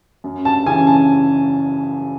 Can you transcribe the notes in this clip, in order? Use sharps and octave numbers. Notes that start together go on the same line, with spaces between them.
F#2
A5
C#3 E3 G#5
A5